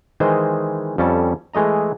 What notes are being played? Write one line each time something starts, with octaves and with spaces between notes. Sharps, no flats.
D#3 E3 G#3 C5 D#5
F2 G3 C#4 A4 A5
E3 G#3 A3 D#5 A#5